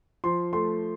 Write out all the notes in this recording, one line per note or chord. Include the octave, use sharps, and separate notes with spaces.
F3 C6
A3 C6